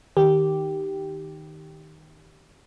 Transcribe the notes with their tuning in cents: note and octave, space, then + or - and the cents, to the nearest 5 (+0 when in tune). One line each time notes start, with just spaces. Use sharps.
D#3 +0 G4 -5